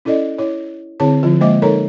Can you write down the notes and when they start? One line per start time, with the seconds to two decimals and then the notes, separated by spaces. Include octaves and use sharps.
0.05 C#4 E4 A4 D5 D#5
0.38 E4 C#5
1.00 D3 C4 E4 G#4 C#5 A5
1.23 D3 F3 F4
1.41 G#3 A#3 C5 D#5 E5 D6
1.62 D#4 A4 A#4 C#5 A#5